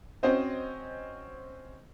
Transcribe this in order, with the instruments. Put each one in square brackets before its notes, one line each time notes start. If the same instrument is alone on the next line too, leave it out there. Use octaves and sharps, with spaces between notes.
[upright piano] C4 C#4 F#4 C5 D#5